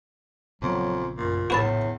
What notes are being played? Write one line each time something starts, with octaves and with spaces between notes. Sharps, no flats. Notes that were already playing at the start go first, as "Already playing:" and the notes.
A#1 F2 C#3 F#3 B3
F#2 A#2
E2 A2 F#4 B4 A5